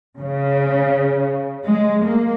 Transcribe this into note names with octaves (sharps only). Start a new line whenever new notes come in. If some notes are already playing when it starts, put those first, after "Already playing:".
C#3
G#3
A#3